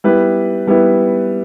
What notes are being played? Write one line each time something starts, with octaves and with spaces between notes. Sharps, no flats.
G3 B3 E4 B4
G3 B3 E4 B4